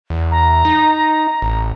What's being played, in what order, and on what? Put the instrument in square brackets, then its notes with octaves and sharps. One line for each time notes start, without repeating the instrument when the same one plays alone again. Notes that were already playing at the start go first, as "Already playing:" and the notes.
[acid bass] E2
[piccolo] A#5
[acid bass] D#4
A1